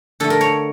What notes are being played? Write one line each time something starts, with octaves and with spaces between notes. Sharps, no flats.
D3 A3 A4
A#4
C#5